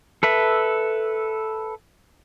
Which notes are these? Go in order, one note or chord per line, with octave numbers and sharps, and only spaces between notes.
A4 B4 E5